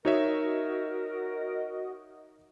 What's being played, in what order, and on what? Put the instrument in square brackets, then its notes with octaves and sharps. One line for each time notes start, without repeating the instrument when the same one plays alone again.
[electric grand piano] D#4 C#5 E5 [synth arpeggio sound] F#4 D#5 [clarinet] A#4